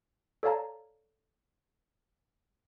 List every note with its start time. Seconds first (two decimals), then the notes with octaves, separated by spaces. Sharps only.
0.43 A4 C#5 D5 F5 A5 A#5